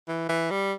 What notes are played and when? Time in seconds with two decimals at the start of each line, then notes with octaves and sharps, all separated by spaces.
0.08 E3
0.29 E3
0.51 G3